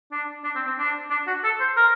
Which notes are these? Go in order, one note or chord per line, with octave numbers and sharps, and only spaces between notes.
D4
D4
C4
C4
D4
D4
F#4
A4
C5
A#4